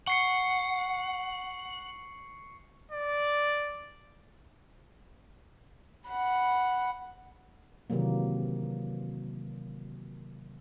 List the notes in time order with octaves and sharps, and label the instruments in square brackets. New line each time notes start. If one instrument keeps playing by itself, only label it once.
[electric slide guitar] F#5 [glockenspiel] C#6 C7 C#7
[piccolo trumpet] D5
[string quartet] F#5 B5
[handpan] C3 D#3 E3 F#3 A#3